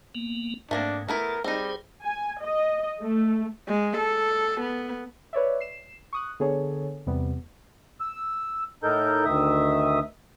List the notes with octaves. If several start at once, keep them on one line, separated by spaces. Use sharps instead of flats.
A#3 B3
G#2 A3 A#3 C4 D4
A3 B3 E4 A4 A#4
G3 C4 D#4 G#4 C5
G#5
D#5
A3
G#3
A4
B3
B4 C#5 D5 E5
C7 E7
C#6 D#6 F#6
D3 B3 G#4 A4 C#5
E2 C3 G3 B3
E6
A2 D#4 A4 A#4 G6
D2 D#3 E5 D#6